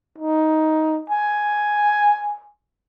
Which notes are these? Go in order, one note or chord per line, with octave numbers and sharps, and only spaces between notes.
D#4
G#5